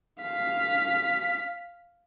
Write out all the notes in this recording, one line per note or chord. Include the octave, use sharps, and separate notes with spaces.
F5 B6